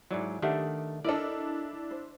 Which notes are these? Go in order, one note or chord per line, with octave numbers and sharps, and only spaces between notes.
G#2 F#3 E4 D5
D#3 A3 D4 G4 E5 F#5
D4 E4 A4 A#4 D5 D#5
C5